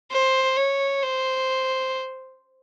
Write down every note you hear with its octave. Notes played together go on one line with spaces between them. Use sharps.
C5
C#5
C5